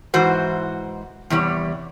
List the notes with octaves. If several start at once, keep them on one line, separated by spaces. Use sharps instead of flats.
G#2 E3 F#4 C5
E2 C3 G3 C#5